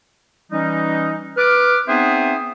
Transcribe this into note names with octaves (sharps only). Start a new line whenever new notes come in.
E3 G3 C#4 D#4
B4 D6 F6
B3 C4 D#4 G#4 C5 E5